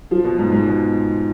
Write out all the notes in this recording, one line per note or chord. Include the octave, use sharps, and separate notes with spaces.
F3
B2
G#2
G#2
B2